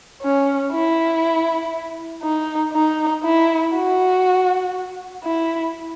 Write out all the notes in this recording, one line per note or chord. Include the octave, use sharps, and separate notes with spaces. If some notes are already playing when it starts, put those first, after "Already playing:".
C#4
E4
D#4
D#4
E4
F#4
E4